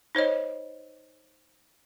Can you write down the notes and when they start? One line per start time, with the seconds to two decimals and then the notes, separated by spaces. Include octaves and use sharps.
0.15 D#4 C5 C#5 D#5